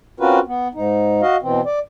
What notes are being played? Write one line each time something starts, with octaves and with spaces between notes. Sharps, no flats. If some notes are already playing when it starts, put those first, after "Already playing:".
C4 C#4 F4 F#4 A#4 B4
B3
G#2 D#4
F#4 D#5 F5
B2 E3 C4
D5